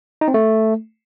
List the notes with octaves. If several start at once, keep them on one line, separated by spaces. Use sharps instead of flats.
D#4
C4
A3